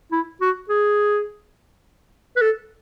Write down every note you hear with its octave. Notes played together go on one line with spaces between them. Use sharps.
E4
F#4
G#4
B4
A4